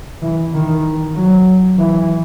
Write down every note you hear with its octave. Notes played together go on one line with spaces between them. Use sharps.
E3
D#3
F#3
E3